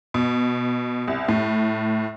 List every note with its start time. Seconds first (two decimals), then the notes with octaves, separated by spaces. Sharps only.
0.14 B2
1.08 C2
1.28 A2